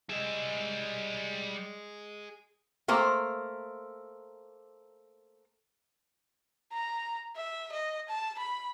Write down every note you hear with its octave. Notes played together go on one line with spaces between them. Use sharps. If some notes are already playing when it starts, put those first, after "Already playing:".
G3 G#4 D#5 E5
A3 A#3 C5 A#5
A#5
E5
D#5
A5
B5